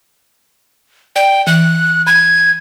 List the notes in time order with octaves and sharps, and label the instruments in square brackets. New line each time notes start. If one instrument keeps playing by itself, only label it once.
[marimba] D5 [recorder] G5
[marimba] E3 [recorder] F#6
[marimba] B5 [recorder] G#6